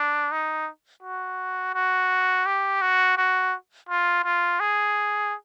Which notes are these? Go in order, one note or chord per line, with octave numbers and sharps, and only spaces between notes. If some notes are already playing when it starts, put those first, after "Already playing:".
Already playing: D4
D#4
F#4
F#4
G4
F#4
F#4
F4
F4
G#4